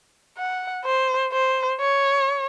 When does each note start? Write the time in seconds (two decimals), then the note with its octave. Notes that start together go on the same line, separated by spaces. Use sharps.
0.38 F#5
0.85 C5
1.33 C5
1.81 C#5